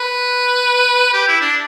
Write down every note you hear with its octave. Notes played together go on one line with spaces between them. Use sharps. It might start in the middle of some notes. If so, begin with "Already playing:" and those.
Already playing: B4
G4
E4
D4